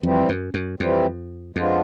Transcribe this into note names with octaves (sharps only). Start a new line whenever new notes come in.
F2 E3 G3 C4
F#2
F#2
F2 E3 G3 C4
F2 F3 G#3 B3 D4 F4